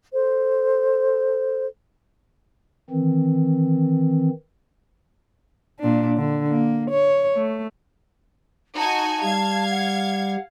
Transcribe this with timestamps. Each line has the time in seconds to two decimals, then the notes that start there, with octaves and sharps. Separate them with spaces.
0.13 A4 C5
2.90 D#3 E3 C4
5.79 A#2 D4
6.17 D3
6.48 A#3
6.90 C#5
7.36 A3
8.77 D#4 F#4 G#5 A5
9.23 G3 F5 G#6
9.70 F#5